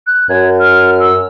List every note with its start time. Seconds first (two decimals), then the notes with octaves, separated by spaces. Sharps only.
0.07 F#6
0.29 F#2 G#6
0.59 F6
1.00 E6